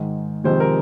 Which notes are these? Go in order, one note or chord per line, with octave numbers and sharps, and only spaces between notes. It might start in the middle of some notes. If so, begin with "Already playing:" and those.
Already playing: G#2 D#3 G#3
F2 C3 D#3 G#3 C5
A#4